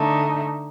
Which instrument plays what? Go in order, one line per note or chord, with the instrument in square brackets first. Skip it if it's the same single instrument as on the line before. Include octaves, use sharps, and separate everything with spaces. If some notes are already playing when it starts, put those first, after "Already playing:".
Already playing: [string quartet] D3 A3 D#4